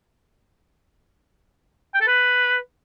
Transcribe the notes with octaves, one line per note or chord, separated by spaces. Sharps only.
G5
A4
B4